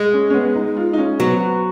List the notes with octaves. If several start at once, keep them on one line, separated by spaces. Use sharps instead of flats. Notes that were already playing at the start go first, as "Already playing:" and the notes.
Already playing: G#3
C#4
C#4
B3
D#4
F4
D#4
C#4
F#3 B3
B3